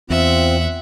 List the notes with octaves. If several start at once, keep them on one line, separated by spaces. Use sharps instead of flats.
E2 C4 F4 E5 F#5